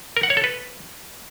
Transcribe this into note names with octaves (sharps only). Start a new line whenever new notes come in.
A#4
F#5
C#5
A4
B4